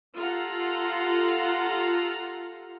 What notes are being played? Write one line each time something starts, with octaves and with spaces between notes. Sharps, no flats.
F4 G4 A4 F5 F#5 A#5